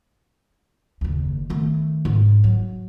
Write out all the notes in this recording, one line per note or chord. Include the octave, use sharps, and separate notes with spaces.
F#1 D#2
D#3 A3
G#2
F#3